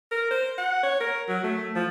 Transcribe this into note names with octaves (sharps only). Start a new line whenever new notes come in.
A#4
C5
F#5
C#5
A#4
F#3
A3
F3